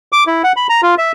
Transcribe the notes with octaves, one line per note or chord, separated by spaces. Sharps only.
D6
E4
F#5
B5
A#5
F4
E5